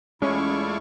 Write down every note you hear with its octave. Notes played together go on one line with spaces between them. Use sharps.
E2 G#3 A3 C#4 E4 F4 D5 C#6